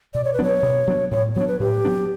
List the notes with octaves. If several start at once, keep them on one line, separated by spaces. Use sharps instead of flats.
B2 D5
C#5
B4
F#3 B3 D4 C#5
B2
F#3 B3 D4
A2 C#5
F#3 B3 D4 C#5
B4
A2 G4
F#3 B3 D4